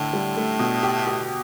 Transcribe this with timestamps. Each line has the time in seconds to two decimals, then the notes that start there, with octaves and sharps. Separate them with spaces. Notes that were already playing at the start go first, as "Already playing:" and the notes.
Already playing: A2 D3
0.13 G3
0.37 A3
0.59 B2
0.83 G4
1.07 G4